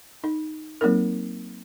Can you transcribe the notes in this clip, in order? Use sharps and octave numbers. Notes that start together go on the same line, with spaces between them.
D#4
F#3 A#3 C4 D#4 A#4